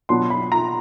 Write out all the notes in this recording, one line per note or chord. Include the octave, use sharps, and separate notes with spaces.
B2 F#3 B3 D4 C6
B5
A#5